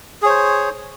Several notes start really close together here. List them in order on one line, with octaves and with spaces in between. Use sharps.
G#4 C#5 C5